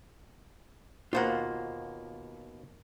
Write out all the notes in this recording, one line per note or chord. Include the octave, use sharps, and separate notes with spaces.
D#2 B2 A#3 F4 C5 F#5